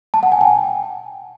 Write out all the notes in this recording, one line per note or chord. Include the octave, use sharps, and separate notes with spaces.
A5
F#5
G#5
G5